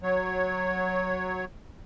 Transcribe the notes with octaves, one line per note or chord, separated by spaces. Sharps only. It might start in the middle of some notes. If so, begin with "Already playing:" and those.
F#3 C#5